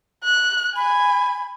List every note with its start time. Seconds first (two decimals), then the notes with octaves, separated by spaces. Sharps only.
0.24 F#6
0.76 G#5 B5